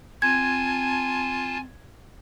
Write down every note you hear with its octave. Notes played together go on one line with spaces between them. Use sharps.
C4 F4 G#5 A5 G#6